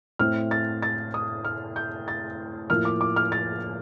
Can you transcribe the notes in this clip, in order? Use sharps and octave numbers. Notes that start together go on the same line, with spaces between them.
A2 A3 C4 F6
A6
A6
D#6
F6
G6
A6
A2 F3 A#3 F6
D6
D6
F6
A6